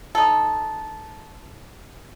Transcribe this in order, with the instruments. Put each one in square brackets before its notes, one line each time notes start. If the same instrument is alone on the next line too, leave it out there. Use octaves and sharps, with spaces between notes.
[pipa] D#4 A4